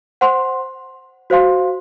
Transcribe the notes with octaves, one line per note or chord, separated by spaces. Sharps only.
C5 F#5 C6
F#4 C5 F5 C6